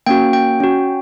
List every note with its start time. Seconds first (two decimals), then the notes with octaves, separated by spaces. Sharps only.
0.06 A#3 C#4 F#4 G5
0.33 G5
0.60 C#4 F#4